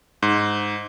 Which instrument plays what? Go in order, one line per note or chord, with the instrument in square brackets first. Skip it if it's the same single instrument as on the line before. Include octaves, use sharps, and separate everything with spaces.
[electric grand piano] G#2